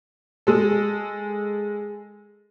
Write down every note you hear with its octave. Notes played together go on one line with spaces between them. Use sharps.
G#3 A4